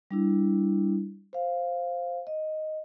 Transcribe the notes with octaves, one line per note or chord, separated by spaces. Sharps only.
G3 D4 E4
C5 F5
D#5